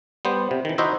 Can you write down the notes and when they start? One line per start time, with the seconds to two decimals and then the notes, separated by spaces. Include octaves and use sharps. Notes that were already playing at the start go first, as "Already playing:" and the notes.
0.25 G3 B3 C5
0.51 C3
0.65 D#3 E3
0.78 D#4 E4 F#4 C5 D#5 E5